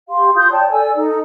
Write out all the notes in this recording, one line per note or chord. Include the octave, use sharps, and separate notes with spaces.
G4 F5 C6
F4 C6 D#6 G6
C#5 D5 G5 A5
A4 D5 G#5 E6
D#4 A4